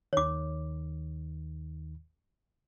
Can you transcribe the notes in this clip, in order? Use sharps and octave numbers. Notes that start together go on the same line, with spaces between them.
D#2 D#3 C#5 D6